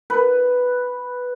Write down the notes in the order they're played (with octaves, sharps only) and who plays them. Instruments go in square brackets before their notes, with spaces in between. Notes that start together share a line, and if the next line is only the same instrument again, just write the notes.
[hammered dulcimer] B4